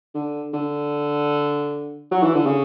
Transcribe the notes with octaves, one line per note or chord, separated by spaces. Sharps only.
D3
D3
F#3
E3
D3
C#3